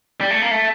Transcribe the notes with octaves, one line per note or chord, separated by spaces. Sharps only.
G3
A3
A#3
A3